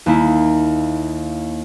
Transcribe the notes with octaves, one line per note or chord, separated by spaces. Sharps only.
D#2 A#3 E4